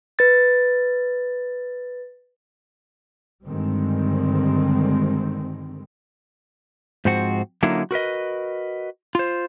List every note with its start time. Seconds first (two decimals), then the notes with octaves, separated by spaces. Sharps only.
0.19 B4 A6
3.46 G2 D3 D#3 G3 G#3 C4
7.05 G#2 F3 C4 F#4
7.63 D3 F#3 A#3 C#4 D#4 E4
7.91 F#4 A#4 B4 D#5
9.15 F4 C5